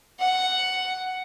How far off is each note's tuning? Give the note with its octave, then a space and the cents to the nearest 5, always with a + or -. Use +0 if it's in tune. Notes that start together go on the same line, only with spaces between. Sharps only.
F#5 +5